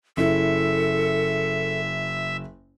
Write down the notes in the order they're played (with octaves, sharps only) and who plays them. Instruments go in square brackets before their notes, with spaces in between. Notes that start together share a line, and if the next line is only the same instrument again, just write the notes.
[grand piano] F#1 E4 [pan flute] A4 [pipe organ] E5